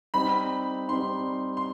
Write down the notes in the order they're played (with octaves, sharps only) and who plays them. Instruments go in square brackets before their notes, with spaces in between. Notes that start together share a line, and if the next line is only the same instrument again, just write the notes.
[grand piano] G3 C4 D#4 [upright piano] B5
[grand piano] G3 C4 D#4 [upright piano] C6
[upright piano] C6